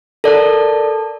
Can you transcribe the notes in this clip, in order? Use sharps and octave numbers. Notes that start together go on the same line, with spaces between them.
A4 A#4 D5 A5